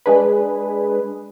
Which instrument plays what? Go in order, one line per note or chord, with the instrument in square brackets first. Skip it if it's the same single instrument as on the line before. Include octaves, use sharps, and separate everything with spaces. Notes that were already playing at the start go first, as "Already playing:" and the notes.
[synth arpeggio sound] G#3 D4 G#4 B4